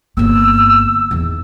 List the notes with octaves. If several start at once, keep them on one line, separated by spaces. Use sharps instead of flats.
G1 A#3 E6
E2 D#3